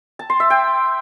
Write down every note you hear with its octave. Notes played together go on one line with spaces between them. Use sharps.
A5
C6
E5
G5